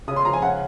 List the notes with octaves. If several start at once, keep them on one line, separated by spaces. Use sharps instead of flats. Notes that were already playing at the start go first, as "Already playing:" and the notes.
C#3 D#6
C6
F3 A#5
G#5
C#3 F#5